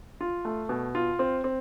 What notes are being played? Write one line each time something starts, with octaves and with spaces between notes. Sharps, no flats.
F4
A3
B2
F4
C4
C4